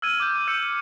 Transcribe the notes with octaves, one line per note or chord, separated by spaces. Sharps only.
E6 F6 G#6 D#7
D6 G6
E6 G6 C#7 D#7